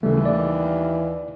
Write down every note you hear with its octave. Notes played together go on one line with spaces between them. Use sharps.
D#2 C#3 E3 G3 A3
D5